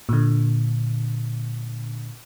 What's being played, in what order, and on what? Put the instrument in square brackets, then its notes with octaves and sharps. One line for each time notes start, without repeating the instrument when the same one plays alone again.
[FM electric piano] A#2 D3